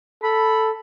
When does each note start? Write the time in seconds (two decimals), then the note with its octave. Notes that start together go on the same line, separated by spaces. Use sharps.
0.23 A4 B5